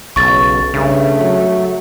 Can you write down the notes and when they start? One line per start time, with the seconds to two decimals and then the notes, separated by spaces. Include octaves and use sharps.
0.16 B1 C#3 C#6 A6
0.74 G2 C#3 A3
1.20 F#3